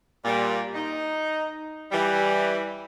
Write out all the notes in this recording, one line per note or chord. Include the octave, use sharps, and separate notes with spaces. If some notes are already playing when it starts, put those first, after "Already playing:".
A#2 G3
D#4
E3 G3